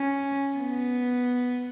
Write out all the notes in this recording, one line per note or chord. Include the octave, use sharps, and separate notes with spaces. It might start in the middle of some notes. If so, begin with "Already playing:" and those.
Already playing: C#4
B3